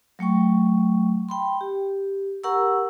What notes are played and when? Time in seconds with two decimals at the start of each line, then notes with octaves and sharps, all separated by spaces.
0.19 F#3 A3 G5 C#6
1.29 G5 B5 C6
1.61 G4
2.44 G4 A#4 F#5 A#5 C#6 E6